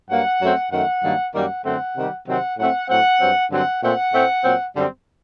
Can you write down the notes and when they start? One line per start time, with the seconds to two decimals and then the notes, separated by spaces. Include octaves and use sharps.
0.09 G2 F#3 A#3 F#5
0.40 F#2 F#3 A3 C4
0.72 F#2 D#3 A3 F#5
1.03 G2 D#3 F#3 A#3
1.34 F#2 D#3 G3 A#3 F#5
1.65 F#2 D3 A3 C4 F#5
1.96 C3 D#3 G3
2.27 C3 D#3 F#3 C4 F#5
2.58 A2 F#3 A3 C4 F#5
2.89 A2 F#3 C4 F#5
3.20 G2 F#3 C4
3.51 G2 D3 F#3 C4 F#5
3.82 A#2 A3 C4 F#5
4.13 A2 A3 C4
4.44 A#2 F#3 C4
4.75 F#2 D3 G3 C4